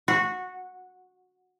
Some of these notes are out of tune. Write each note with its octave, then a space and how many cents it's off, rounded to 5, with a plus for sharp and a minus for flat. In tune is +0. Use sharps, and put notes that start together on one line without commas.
F#4 -15